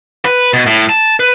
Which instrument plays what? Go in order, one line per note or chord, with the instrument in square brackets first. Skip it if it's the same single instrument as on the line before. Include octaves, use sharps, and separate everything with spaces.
[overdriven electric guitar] B4
B2
A2
A5
B4